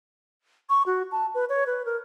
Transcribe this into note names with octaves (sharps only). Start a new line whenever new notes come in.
C#6
F#4
A5
B4
C#5
B4
A#4